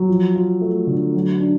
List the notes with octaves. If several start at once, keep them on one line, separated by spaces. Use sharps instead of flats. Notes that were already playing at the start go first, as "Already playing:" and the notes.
Already playing: F#3
F3
F4
A3
D3
F#3
D4